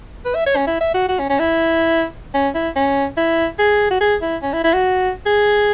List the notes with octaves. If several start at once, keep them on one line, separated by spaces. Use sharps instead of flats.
B4
E5
C#5
C#4
E4
E5
F#4
F#4
C#4
C#4
E4
C#4
E4
C#4
E4
G#4
F#4
G#4
E4
C#4
E4
E4
F#4
G#4